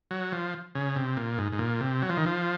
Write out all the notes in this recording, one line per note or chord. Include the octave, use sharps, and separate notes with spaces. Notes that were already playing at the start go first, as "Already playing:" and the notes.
F#3
F3
C#3
C3
A#2
G#2
G#2
A#2
C3
F#3
F3
D#3
F3